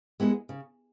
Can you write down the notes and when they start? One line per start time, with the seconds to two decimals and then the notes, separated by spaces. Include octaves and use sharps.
0.20 G#3 B3 E4 G#4
0.49 C#3